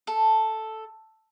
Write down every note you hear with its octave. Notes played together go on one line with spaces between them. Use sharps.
A4